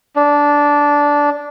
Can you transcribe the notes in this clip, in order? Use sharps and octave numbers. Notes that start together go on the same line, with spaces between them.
D4